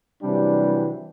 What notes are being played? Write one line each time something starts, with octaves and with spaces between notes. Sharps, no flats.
C3 E3 F#3 G3 D4